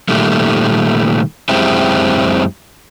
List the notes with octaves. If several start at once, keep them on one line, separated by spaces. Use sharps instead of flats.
A#2 D#3 G3 A3
F#2 G#3 C4 E4 G4